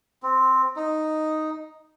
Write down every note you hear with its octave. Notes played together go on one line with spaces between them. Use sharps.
C4
D#4